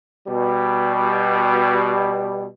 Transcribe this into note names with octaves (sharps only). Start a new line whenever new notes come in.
B2 G3